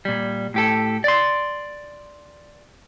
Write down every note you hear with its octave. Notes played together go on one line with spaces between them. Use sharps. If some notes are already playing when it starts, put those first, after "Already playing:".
A#2 G3
A2 G4 A4
D5 C6